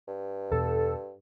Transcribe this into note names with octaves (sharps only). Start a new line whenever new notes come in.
G2
E2 B2 A4